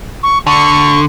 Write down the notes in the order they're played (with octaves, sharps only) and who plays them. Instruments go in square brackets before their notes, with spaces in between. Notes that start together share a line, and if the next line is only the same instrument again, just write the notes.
[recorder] C#6
[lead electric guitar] D3 [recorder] C#6